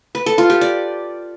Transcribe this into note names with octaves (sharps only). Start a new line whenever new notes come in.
B4
A4
F4
G4
D5